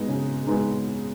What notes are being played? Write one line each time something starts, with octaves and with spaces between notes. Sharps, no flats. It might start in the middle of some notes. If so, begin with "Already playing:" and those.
Already playing: G#3 B3 D#4
C#3
G#3 B3 D#4